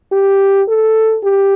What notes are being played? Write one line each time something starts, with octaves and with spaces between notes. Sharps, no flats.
G4
A4
G4